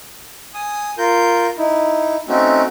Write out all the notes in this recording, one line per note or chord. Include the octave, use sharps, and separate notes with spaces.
G#5 D#6
F4 A#4 G6
D#4 E4
A3 C4 C#4 D#4 F#4